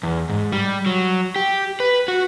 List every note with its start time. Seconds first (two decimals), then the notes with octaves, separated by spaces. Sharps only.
0.03 E2
0.29 G#2
0.52 G3
0.86 F#3
1.36 G4
1.80 B4
2.08 F#4